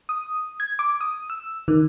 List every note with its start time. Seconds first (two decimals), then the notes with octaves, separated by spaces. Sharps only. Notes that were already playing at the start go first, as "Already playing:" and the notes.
0.09 D#6
0.60 G#6
0.79 D6
1.01 D#6
1.30 E6
1.68 D#3